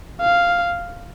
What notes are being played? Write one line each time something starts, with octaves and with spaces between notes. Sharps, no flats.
F5